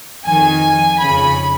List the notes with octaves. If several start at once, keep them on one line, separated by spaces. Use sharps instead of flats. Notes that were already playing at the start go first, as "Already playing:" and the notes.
F2 D#3 G#5
F2 C#3 B5